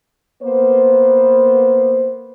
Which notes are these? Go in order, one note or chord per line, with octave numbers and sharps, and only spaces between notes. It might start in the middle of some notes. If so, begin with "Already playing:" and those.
A#3 B3 C5